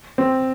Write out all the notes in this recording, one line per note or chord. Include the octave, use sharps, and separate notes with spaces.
C4